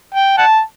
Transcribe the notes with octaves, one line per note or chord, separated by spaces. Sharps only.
G5
F#5 A5